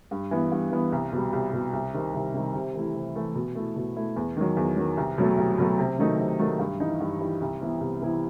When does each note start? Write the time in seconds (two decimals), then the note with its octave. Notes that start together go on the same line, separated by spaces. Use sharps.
0.11 G2
0.31 E3 B3
0.51 G2
0.72 E3 B3
0.92 C2
1.13 B2 G3
1.33 C2
1.53 B2 G3
1.73 C2
1.94 C3 D#3 G3
2.14 C2
2.34 C3 D#3 G3
2.54 C3
2.74 E3 A3 E4
2.95 C3
3.15 E3 A3 E4
3.35 B2
3.55 A3 E4
3.76 B2
3.96 A3 E4
4.16 E2
4.37 D#3 F#3
4.57 E2
4.77 D#3 F#3
4.97 C2
5.18 B2 F#3 A3
5.38 C2
5.58 B2 F#3 A3
5.78 C3
5.98 D#3 F#3 A3 D#4
6.19 C3
6.39 D#3 F#3 A3 D#4
6.59 G2
6.80 E3 G3 D#4
7.00 G2
7.20 E3 G3 D#4
7.41 C2
7.60 C3 E3 B3 E4
7.81 C2
8.01 C3 E3 B3 E4